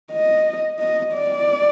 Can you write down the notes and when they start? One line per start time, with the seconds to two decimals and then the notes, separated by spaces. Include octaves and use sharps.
0.11 D#5
0.79 D#5
1.13 D5